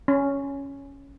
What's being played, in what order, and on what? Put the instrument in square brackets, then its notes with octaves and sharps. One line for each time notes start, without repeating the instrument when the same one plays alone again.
[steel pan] C#4